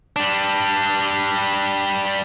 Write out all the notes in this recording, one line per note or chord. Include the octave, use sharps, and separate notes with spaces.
G3 D4